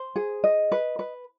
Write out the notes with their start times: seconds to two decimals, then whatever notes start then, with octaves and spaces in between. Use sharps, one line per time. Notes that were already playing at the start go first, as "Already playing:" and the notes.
Already playing: C5
0.16 G#4
0.44 D#5
0.72 B4
0.99 B4